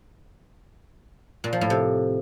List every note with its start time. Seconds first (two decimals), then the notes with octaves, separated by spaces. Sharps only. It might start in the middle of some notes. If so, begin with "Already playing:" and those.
1.44 A#2
1.53 F3
1.61 A2
1.70 C3